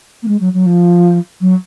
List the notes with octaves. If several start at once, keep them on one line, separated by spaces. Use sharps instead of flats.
A#3
G#3
F#3
F#3
F3
F#3